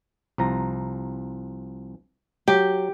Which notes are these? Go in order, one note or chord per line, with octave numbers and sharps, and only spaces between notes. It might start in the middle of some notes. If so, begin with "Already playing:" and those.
C2 F3 A#5
F#3 G4